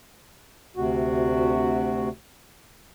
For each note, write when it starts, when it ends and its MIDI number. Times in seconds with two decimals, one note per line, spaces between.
0.77 2.09 38
0.77 2.09 48
0.77 2.09 66